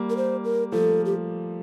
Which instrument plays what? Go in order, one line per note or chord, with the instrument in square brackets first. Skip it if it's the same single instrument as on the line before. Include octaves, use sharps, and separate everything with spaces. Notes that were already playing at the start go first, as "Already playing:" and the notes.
Already playing: [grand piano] G3 A#3
[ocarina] A#4
C5
A#4
[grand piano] F3 A3 [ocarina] A4
[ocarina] G4